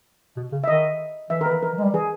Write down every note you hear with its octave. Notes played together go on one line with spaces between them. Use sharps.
B2
C#3
E5
D#3 D#5
E3 E5
D#3 A#4
B4
E3
E3 A#4
E3
G#3
G3
E3 G#4